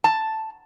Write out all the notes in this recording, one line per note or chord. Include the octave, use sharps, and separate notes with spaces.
A5